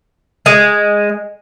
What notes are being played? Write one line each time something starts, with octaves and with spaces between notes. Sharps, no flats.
G#3